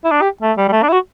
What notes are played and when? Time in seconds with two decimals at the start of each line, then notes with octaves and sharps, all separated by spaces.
0.04 E4
0.11 D4
0.22 G4
0.42 A3
0.58 G3
0.68 G3
0.72 A3
0.83 D4
0.89 E4
0.93 F#4